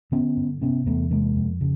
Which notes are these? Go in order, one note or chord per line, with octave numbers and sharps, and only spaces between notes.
D3 B3 C#4
G2
C3 B3 C#4
E2 A3 B3
C3 G#3 A#3
F2
C#3